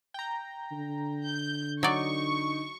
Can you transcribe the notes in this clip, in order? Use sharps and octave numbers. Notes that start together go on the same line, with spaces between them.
G5 A#5
D3
G6
F#3 D#4 D5 C#6